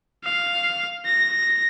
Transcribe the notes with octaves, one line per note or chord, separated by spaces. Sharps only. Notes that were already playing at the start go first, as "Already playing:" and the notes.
F5
A#6